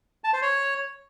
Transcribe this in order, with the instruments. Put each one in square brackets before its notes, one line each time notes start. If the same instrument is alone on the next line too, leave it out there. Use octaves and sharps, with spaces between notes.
[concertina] A5
C5
C#5